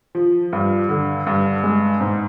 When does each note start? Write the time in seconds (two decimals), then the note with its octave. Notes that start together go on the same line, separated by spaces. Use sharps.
0.15 F3
0.53 G2
0.89 D3
1.27 G2
1.63 G#3
2.01 G#2